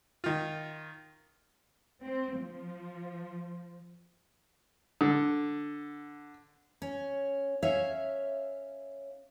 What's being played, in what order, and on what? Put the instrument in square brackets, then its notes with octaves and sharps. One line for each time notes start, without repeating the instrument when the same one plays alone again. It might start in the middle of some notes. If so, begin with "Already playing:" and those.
[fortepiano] D#3 F4
[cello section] C4
F3
[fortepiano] D3
[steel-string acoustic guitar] C#4
C#4 C#5 E5 F5